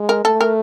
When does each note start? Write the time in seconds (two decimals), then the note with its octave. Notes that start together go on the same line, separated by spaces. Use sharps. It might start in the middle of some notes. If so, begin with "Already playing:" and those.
Already playing: G#3
0.09 A#4
0.25 A3 A4
0.41 A#4